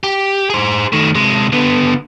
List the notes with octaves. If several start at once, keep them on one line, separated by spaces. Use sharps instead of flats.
G4
G#4 C5
D#3 A3
C3 G#3
D3 B3